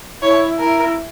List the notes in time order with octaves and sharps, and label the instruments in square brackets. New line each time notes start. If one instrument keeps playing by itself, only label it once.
[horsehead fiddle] E4 [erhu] C#5
[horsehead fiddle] E4 [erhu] A#4